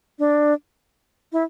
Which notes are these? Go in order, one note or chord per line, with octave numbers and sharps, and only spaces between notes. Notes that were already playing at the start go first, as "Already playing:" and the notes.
D4
E4